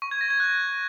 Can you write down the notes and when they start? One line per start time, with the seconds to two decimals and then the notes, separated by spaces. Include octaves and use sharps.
0.02 C#6
0.11 G#6
0.21 A#6
0.30 G#6
0.40 F#6